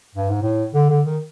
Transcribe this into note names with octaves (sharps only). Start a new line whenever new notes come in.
G2
G#2
A2
D3
D3
D#3